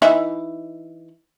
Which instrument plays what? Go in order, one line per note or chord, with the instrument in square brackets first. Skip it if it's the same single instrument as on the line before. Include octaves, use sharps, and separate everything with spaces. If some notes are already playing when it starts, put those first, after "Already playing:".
[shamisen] E3 D#4 E5